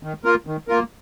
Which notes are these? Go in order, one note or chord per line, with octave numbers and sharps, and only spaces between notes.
D#3
A#3 F4 A#4
D#3
A#3 F4 A#4